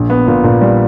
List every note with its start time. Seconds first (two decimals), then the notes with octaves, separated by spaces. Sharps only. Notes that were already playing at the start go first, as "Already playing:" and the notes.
Already playing: A#1
0.10 B3
0.27 A#2
0.44 A#2
0.61 G3